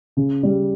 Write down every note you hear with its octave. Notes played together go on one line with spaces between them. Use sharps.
C#3
G3